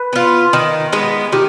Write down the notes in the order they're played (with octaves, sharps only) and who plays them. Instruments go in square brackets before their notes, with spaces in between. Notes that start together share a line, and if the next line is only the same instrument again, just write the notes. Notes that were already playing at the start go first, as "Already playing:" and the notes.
Already playing: [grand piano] B4
[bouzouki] B3 F4
D#3
G#3 B3
[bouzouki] D#3 [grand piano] G4